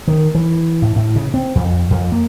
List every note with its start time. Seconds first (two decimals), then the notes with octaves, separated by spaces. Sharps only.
0.08 D#3
0.35 E3
0.82 A2
0.96 A2
1.16 C#3
1.34 C4
1.55 F2
1.91 F2
2.12 A#3